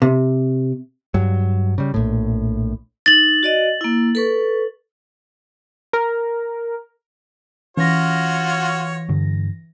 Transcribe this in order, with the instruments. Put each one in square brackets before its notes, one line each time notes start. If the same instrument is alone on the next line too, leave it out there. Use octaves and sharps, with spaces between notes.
[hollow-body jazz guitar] C3
[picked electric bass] G2 F#3
C#3 G3
A#1 A2
[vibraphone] D#4 [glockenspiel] A6 F#7
[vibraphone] F#4 D5 D#5
A#3 E4
A4 B4 C#6
[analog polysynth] A#4
[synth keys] E3 A#6 [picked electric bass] C#4 [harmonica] F4 F#4 C#5
[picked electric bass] G2 D3